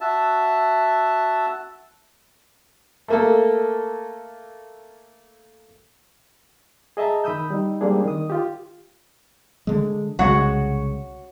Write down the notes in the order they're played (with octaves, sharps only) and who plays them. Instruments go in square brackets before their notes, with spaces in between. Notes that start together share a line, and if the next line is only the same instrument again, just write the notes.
[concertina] F#4 E5 A5
[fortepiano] A3 A#3 A4
[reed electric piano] G#4 D#5 E5 A5 A#5
D#3 B5 D#6 E6 G6
G3 D#4
G3 G#3 A#3 C4 D4 G#4
D#3 D#6
F4 G4
[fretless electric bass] D3 G#3
[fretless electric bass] C2 C#3 G#3 [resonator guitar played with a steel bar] F#4 C#5 F#5